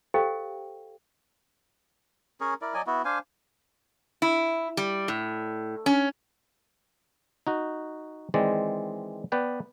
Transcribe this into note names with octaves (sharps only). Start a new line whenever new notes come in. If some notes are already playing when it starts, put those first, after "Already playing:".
G4 A4 C5 D#5 F5 G5
C#4 G#4 A#4 C#5
E4 A#4 D5
F#3 D5 D#5 G#5
B3 E4 F#4
D4 C5 F5 G#5
E4
G3
A2
C#4
D#4 F#4
D#3 E3 G#3 C4 D5
B3 B4 D5 G5